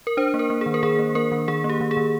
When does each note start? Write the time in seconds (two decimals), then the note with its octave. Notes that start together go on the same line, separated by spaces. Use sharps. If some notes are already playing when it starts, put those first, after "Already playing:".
0.07 A#4
0.17 D4 C5
0.34 A#3
0.39 A#4
0.50 A#3
0.61 D#3 G#4
0.74 A#4
0.83 D#3 G#4
0.99 A#3
1.15 A#3 A#4
1.32 D#3
1.48 D#3 G#4
1.64 A#3
1.69 G4
1.81 D#3
1.91 G#4
1.97 D#3